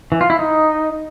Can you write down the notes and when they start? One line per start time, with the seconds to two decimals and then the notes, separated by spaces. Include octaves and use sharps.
0.12 E3
0.21 F4
0.30 E4
0.39 D#4